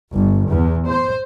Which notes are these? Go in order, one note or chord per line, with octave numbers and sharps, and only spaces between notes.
G1
E2
C5